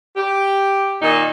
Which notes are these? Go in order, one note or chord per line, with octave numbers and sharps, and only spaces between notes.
G4
A#2 D#3 D#4